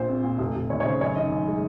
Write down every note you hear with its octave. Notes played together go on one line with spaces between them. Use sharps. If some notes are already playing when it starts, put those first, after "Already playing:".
Already playing: A#1 A#2 C5
C4
A#2
F1
F1
D#2 C#5
C#5
C#3 C5
F#2 C#5
D#3 D#5
F#2
G#3